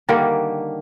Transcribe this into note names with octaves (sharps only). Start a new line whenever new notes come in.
D3 D#3 G3 A#3